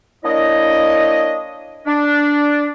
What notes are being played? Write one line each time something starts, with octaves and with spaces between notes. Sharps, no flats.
A#3 D4 E4 C#5 D#5
D4